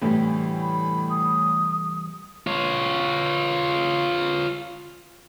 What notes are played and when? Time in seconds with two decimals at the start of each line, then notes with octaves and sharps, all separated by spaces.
0.02 D2 A2 C3 E3 G3
0.61 B5
1.10 D#6
2.47 F4 C#5